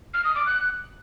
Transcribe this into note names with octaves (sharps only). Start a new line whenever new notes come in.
F6
D#6
D6
F#6